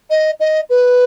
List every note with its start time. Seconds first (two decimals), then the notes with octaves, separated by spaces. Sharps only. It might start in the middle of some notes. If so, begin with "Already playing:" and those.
0.10 D#5
0.40 D#5
0.70 B4